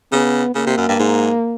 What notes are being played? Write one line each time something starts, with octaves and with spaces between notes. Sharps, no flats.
C#3 B3
C#3 A#3
C3
F#2
G2
G#2